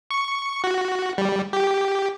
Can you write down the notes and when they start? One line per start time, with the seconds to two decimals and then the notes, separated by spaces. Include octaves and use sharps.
0.11 C#6
0.64 F#4
1.18 G3
1.53 G4